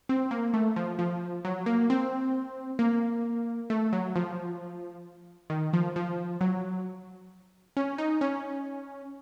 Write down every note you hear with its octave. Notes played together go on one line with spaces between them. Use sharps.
C4
A#3
A3
F3
F3
F#3
A#3
C4
A#3
A3
F#3
F3
D#3
F3
F3
F#3
C#4
D#4
C#4